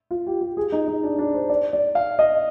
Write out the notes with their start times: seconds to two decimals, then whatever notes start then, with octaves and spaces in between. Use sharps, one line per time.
0.11 F4
0.27 G4
0.41 G4
0.57 G#4
0.72 D#4
0.88 D#4
1.03 D4
1.19 D4
1.34 C5
1.50 D5
1.73 D5
1.95 F5
2.19 D#5